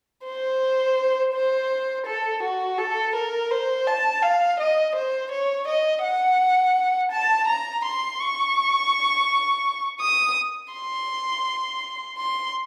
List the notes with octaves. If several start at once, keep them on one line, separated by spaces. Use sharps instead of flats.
C5
C5
A4
F#4
A4
A#4
C5
A5
F5
D#5
C5
C#5
D#5
F#5
A5
A#5
C6
C#6
D#6
C6
C6